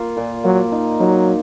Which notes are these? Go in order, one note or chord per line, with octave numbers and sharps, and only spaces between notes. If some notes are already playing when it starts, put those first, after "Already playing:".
Already playing: A#3 F4
A#2
F#3 A#3
D#4
F#3 D#4